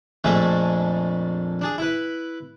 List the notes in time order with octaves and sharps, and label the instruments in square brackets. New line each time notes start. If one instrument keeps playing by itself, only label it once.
[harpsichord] A#1 F2 G#3 A3 G#4 E5
D4 G#4
E4 B4